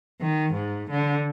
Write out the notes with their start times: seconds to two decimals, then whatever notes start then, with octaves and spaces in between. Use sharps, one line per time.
0.21 D#3
0.53 G#2
0.91 D3